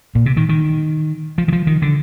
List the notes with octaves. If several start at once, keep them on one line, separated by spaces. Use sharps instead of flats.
A#2
C3
D#3
D#3
F3
D#3
F3
D#3
D3